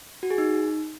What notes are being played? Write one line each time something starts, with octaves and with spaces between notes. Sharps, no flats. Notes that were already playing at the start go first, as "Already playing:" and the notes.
F#4
G#4
D#4